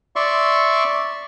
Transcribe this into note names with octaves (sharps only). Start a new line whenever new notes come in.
D5 E5 C6 C#6